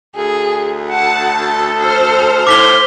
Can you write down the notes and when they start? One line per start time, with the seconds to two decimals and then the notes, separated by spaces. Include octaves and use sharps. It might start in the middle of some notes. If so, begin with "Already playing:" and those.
0.16 D2 G#4
0.89 F#5 A5
1.44 A4
1.77 C5 F6
2.47 A2 D6 B6 G7